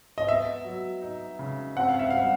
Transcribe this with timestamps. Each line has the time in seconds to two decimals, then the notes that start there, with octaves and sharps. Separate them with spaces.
0.18 D#5
0.27 B3 E5
0.64 F#3
1.02 D#4
1.39 C#3
1.76 C4 F#5
1.89 F5
1.99 E5
2.10 G3 F5